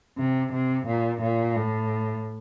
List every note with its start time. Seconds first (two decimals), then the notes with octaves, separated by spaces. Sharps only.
0.18 C3
0.52 C3
0.87 A#2
1.21 A#2
1.56 A2